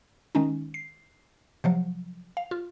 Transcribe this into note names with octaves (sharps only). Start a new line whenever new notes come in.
D#3 G#3 C#4 D#4
C7
C3 F3 F#3
F5
F4